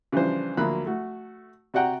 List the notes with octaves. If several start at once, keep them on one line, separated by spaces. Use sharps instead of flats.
C#3 E3 F3 G3 D4 C5
D2 F3 F#3 A#3 B5 F#6
A3 F#4
C3 F#4 D5 F#5 G5 A#5